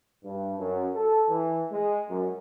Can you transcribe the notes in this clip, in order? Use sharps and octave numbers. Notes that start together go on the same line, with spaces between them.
G2
F#2
A4
E3
G#3
F#2